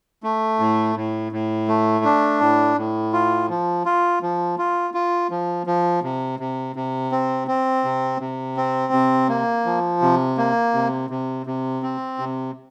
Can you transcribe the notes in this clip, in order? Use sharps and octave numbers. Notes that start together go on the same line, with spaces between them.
A3
A2
A2
A2
A3
D4
A2
A2
F4
F3
F4
F3
F4
F4
F3
F3
C3
C3
C3
C4
C4
C3
C3
C4
C3
A#3
F3
C3
A#3
C3
C3
C3
C4
C3